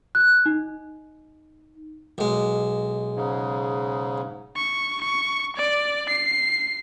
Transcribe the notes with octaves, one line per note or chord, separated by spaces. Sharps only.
F#6
D#4
B1 G#3
G#2 C#3
C#6
C#6
D5
C7